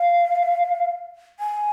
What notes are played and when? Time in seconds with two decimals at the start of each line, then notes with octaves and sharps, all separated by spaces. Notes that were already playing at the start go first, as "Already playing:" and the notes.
Already playing: F5
1.40 G#5